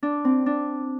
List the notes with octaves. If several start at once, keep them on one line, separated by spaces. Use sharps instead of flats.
D4
C4
D4